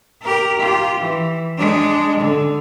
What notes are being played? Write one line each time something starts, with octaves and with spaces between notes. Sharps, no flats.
G4 A#4
F4 G4
E3
G#3 D4
D3